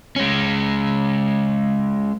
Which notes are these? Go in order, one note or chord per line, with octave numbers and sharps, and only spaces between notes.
G#3 C#4